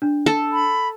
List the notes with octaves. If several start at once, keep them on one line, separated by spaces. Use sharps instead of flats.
D4
A4
B5